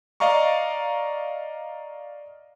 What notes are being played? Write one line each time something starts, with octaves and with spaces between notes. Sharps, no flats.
D5 D#5 F5 A#5 C#6